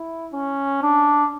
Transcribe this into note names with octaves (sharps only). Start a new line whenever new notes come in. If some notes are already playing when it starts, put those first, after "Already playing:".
Already playing: E4
C#4
D4